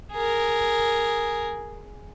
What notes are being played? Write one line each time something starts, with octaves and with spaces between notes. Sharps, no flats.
G#4 A#4